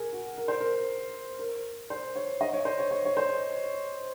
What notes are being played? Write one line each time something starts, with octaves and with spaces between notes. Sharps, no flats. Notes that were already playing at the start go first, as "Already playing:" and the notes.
Already playing: G#4 A#4
F#4
A#4
C5
A#4
A#4
C5
C#5
D#5
C#5
C5
C#5
C#5
C#5
C5